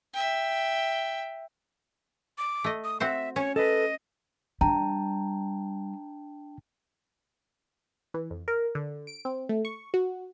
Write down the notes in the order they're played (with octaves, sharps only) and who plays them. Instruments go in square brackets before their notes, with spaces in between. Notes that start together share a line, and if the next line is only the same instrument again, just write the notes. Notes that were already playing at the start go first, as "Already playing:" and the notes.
[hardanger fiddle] E5 G5
[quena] D6
[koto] A3 D#5
[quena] D#6
[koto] C4 F#4 C5 [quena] E5
[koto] C#4 [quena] C#5
[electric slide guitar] A4 B4 [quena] D#5
[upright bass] G3 [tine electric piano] D4 G5 A5 [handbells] A#5
[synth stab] E3
F2
A#4
D3
D7
C4
A3
C#6
F#4